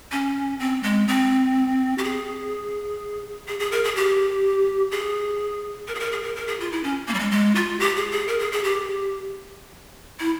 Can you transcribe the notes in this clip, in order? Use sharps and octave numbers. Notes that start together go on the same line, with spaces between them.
C#4
C4
G#3
C4
G4
G#4
G#4
G#4
A#4
G#4
G4
G#4
A#4
G#4
A#4
G#4
A#4
A#4
G#4
F4
E4
C#4
A#3
G3
G#3
G#3
F4
G4
G#4
G#4
A#4
G#4
G#4
G4
E4